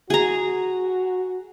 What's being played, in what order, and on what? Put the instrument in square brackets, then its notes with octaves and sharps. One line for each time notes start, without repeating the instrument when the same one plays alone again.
[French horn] F#4 [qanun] G#4 A#5